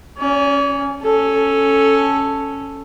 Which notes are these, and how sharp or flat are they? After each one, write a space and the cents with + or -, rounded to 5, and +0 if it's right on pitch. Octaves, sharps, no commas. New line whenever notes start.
C#4 +0 D5 -45
C#4 +0 A4 +0